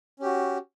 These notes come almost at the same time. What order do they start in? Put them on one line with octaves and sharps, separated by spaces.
C#4 G4 F#4